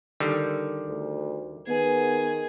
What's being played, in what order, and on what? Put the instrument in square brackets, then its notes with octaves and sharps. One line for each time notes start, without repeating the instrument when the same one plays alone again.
[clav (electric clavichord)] D3 D#3 G3
[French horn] D2
[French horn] D#3 [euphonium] B3 [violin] G#4